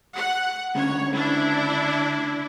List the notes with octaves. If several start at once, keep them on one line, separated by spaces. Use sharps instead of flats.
F#5
D2 C#3 C#5
D4 E4